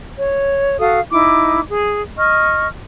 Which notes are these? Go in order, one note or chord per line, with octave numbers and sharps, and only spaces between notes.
C#5
F#4 A4 F5 D#6
D#4 E4 D6
G#4
D#5 C#6 F6